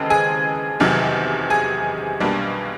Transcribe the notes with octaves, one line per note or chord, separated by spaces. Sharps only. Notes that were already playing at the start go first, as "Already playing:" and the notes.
Already playing: D#2 C#3 E3 G#3 C4 A4 A5
G#4 G#5
F1 E2 C3 D#3 F#3
G#4 G#5
B1 B2 G3 A#3 D4